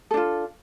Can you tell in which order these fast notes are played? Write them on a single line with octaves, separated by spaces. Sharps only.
A4 D4 F4